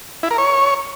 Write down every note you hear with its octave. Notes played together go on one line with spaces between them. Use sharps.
E4
A#4
C#5